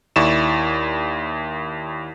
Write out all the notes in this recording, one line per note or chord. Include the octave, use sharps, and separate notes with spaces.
D#2 E4 D5 C#6 E7